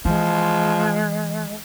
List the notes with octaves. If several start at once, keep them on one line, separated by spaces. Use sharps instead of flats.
E3 F3 G#3